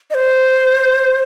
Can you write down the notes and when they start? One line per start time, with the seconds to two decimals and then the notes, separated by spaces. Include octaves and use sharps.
0.10 D#5
0.14 C5